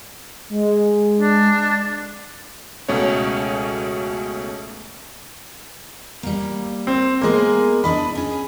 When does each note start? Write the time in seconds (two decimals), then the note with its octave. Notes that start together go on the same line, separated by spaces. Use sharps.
0.50 G#3
1.19 D4
2.88 C#2 B2 A3 C#4 C#5
6.23 G3 A#3
6.87 C4
7.21 G#3 A#3 B3 G#4 A#4
7.84 D4 E4 D#5 B5
8.15 C#4 G#4